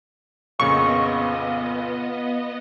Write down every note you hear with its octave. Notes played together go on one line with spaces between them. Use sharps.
F2 A#2 C#3 B3 F4 D#5 C#6